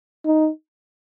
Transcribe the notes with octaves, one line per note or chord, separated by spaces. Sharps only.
D#4